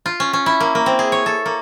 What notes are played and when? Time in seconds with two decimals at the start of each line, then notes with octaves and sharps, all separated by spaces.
0.06 F4
0.20 C#4
0.33 C#4
0.46 E4
0.60 A#3
0.75 A#3
0.86 C4
0.99 G#4
1.12 C#5
1.26 A4
1.46 A#3